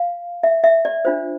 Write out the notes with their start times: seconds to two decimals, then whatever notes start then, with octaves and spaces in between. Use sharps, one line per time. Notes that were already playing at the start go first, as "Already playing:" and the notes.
Already playing: F5
0.43 E5
0.64 E5
0.85 D5
1.05 D4 F4 C5